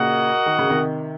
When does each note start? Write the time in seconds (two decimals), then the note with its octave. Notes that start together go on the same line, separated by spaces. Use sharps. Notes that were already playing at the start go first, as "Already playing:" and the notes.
Already playing: A#2 C#3 F#4 A#4 D#5 F#5
0.46 D#3
0.58 C#3
0.70 C3 D#3